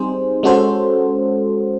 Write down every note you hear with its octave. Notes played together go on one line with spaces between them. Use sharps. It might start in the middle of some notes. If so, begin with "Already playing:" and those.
Already playing: G3 C4 D#4 G#4 C5
G#3 C#4 F#4 A4 C5